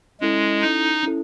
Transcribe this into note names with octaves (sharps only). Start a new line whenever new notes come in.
G#3 C#4 E4 A4
D#4
C#4 E4 A4